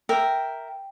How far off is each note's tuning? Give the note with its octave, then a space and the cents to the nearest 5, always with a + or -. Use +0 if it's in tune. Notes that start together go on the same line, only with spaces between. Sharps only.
A#4 +0 E5 +0 G5 +0